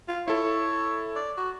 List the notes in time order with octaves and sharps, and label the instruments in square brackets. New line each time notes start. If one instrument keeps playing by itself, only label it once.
[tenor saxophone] F4
[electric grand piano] E4 A4 [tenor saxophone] C#5
[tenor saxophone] D5
F#4